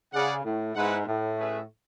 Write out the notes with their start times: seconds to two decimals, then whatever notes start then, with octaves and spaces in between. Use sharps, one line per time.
0.13 C#3 C#4 G#4 D5 F#5
0.45 A2
0.75 G#2 G#3 B3 E4 B4 F#5
1.06 A2
1.38 A3 C#4 G#4 B4 E5